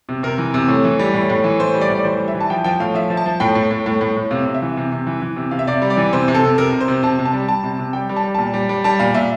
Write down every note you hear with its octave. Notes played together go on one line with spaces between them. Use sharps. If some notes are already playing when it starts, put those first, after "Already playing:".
C3
C3 A#4
E3
C3
A2
E3
G3
A2
A2
E3
A2 C5
G3
D5
A2
D5
E3 C5
G3
E5
E3
A5
F3 G5
F3 G5
A2 F5
F3 E5
F3
A5
F3
A2 G5
A2
A2
A2
A2
A2
C3 F5
C3
E5
E3
C3
C3
E3
E3
C3
C3 F5
E5
C3 D5
G3
D5
E3
C3 C5
C3
A4
C3
C3 A#4
C3
C5
C3
C3 A5
C3
A5
G3
G3 A5
C3
C3
G3 G5
G3
A5
G3
A#2 A5
G3
G3
G3 A5
A#2 F5
A#2 E5